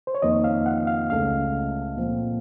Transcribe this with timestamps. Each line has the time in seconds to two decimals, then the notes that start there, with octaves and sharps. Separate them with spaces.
0.07 C5
0.15 C#5
0.22 F2 D#3 A#3 F4 D#5
0.44 F5
0.66 F#5
0.87 F5
1.10 C#2 C#3 A3 C#4 F5
1.97 A#2 F3 C4